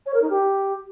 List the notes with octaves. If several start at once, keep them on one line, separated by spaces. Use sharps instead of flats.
C#5
A#4
D#4
G4